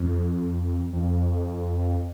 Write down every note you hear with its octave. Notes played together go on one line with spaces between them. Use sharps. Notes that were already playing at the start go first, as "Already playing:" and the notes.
Already playing: F2
F2